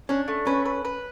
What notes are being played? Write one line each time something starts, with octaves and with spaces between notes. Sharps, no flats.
C#4 D4
A3
C#4 B4
B4
B4